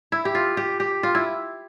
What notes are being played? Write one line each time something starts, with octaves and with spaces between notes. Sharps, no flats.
E4
G4
F4
G4
G4
F4
E4